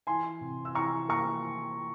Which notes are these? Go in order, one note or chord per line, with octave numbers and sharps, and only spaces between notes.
E3 G#5 C6
C3
E6
E3 A#5 C#6
A#3 A#5 C#6